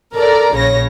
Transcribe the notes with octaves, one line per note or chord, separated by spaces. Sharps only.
A4 A#4 D5 A#5
A#1 C#3 C#5 A#6